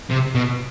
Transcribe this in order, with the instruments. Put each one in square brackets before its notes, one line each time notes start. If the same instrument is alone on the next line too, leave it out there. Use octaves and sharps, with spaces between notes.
[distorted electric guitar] C3
B2